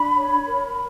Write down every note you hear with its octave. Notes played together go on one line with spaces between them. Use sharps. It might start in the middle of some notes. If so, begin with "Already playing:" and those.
Already playing: D4 B5
C#5
A#4